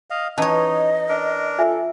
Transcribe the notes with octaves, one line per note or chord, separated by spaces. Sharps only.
D#5 F5
E3 C#4 D#4 C#5 D#5 A5
D4 A#4
F4 A4 E5 G#5